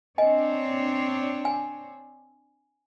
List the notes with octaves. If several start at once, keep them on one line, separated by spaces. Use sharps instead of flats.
C4 D4 C#5 D#5 G#5
G#5